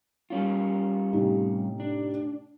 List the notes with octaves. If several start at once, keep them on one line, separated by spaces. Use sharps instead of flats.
G3 C#4 F4
A2 C3 D#4
D4